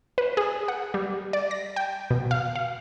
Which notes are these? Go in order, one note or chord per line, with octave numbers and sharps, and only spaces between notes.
B4
G#4
F#5
G3
D5
A#6
G5
B2
F5
F5